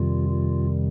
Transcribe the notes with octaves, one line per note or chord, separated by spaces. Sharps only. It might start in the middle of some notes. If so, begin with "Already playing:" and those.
Already playing: F2 C3 D#3 G3 F4
F4